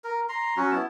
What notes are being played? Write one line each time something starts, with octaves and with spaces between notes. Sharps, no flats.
A#4
A#5 C6
F#3 C#4 F#4
B3 E4 A5